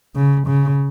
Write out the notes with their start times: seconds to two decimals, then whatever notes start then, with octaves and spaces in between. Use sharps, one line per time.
0.16 C#3
0.47 C#3